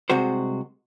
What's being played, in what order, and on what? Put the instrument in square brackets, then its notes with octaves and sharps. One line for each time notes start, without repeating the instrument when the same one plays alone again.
[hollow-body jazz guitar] C2 C3 G#3 F#4 C5